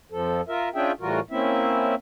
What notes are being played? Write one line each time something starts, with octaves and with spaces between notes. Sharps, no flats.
F2 F3 A4
F4 A#4 E5
C#4 D4 F4 G#4 E5 G5
A2 E3 G3 F4 F#4 A#4
A#3 C4 C#4 E4 E5